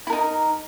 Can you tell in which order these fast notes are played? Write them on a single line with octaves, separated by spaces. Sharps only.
E4 A#4 D#4